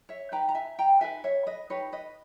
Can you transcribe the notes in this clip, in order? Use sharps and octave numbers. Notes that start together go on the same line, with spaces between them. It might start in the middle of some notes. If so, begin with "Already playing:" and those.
C#5 E5
D#4 G4 B4 G5 A#5
A#5
E5 G#5
G5 A#5
D#4 G4 B4 E5 G#5
C#5 E5
B4 D#5
D#4 G4 B4 C#5
B4 D#5